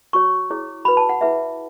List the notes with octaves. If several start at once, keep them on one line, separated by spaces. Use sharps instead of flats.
F#4 C#5 C#6
E4 G#4 C#5
F#4 B4 B5
A5
F#5
E4 G#4 B4 E5